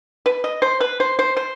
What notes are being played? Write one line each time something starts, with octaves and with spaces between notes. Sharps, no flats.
B4
D#5
C5
B4
C5
C5
C5